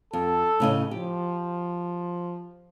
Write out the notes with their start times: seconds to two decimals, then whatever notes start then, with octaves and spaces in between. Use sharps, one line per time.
0.13 F2 A4
0.60 A2 C#3 D#5
0.91 F3 G4